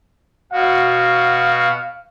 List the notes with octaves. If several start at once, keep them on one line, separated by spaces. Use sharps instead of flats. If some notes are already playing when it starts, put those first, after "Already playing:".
B2 F#4 F5